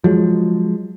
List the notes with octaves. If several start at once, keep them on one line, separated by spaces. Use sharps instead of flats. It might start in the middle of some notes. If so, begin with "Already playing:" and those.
F3 F#3 G#3